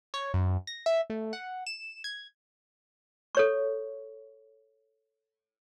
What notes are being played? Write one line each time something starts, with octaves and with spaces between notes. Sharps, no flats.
C#5
F#2
A#6
E5
A3
F#5
E7
G#6
A4 C#5 C#6